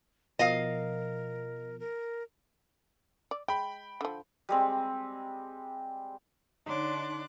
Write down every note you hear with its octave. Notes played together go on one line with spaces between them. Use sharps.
B2 F3 A#4 D#5 F5
A#4
D5
G#3 G5 B5
D3 F3
G3 G#3 C4
D3 D4 D#4 C#5 C6 D6 F#6